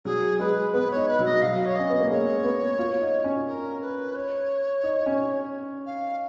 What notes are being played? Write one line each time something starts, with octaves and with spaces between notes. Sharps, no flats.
F#3 G#4
G#3 B4
B3 B4
C#5
D#4
B4
F#3
D#5
F#3 F5
C#5
C#4 D#5
B3
A#3
G#3 C#5
B3
F4
D#4
C#4
A#4
B4
C#5
D#4
C#4
F5